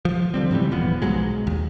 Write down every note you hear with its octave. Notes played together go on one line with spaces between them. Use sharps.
F3
D3 G3 C4
G#2 C#3 E3 G3
D#1 E3 F3 B3
B1 G#2 F#3 G#3
D#2